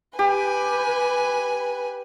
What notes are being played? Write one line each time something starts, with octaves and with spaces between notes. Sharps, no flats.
G4 B4 G#5